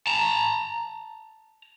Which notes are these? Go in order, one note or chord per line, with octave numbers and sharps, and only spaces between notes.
A5 A#5